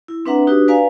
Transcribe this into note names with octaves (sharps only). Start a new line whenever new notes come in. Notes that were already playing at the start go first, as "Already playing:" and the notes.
E4
C4 D4 B4 E5 F#5 A#5
D4 D#4 F#4 G4 B4
B4 D5 F5 G#5 A#5